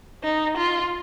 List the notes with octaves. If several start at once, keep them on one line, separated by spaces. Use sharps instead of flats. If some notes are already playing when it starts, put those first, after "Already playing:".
D#4
F4